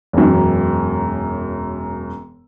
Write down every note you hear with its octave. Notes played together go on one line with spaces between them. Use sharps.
E1 F#2